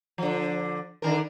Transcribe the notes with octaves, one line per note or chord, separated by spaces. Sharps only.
D3 F3
D3 D#3 A#4